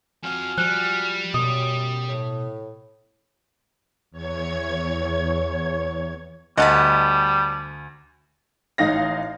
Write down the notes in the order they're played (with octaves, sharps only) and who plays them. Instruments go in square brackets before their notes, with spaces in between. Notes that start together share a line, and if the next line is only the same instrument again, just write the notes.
[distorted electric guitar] F2 F3 [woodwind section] F#4 G#5 F6
[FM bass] F3 [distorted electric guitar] G3 [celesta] F#6
[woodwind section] F#2 [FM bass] B2 [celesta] D#6
[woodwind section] A2
[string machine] E2 C#5 G#6
[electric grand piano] D2 [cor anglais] G3 [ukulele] D#5 [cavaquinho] F#5 A5 B5
[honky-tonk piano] A1 D#4 F5 A#6